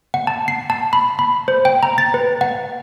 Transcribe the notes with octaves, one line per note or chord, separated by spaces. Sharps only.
F#5
A5
C7
A5
B5
B5
C5
G5
A#5
A6
B4
F#5